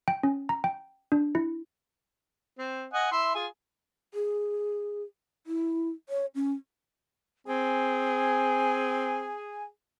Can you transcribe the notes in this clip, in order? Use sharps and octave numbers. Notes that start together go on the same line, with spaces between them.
G5
C#4
A#5
G5
D4
E4
C4
D#5 F#5 G#5
E4 E5 C6
F4 G#4 G#5
G#4
E4
C#5
C#4
C4 G#4 G#5